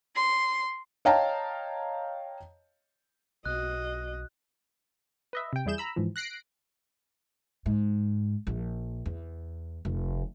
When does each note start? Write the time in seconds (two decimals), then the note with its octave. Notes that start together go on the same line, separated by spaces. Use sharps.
0.16 C6
1.05 C#5 D#5 F5 G5 A5 A#5
3.45 B1 F#4 D#5 F#6
5.33 B4 D#5 E5
5.53 C3 G5
5.66 E2 G3 E4 G#4 G6 E7
5.78 A#5 B5 E6
5.96 G#2 E3 F3
6.16 F#6 A#6 C7 D7
7.66 G#2
8.47 A#1
9.06 E2
9.85 F1